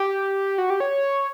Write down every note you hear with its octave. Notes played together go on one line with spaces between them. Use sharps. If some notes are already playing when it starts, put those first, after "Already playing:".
Already playing: G4
F#4
G4
C#5